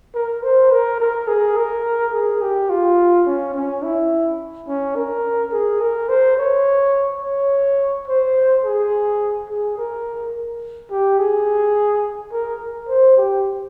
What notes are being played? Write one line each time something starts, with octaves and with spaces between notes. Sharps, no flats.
A#4
C5
A#4
A#4
G#4
A#4
G#4
G4
F4
C#4
C#4
E4
C#4
A#4
G#4
A#4
C5
C#5
C#5
C5
G#4
G#4
A#4
G4
G#4
A#4
C5
G4